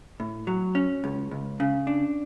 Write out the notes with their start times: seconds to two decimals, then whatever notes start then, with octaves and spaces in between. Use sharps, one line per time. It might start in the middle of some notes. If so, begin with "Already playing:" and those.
0.20 A2
0.47 F#3
0.75 C#4
1.04 C#2
1.31 C#2
1.60 C#3
1.87 D4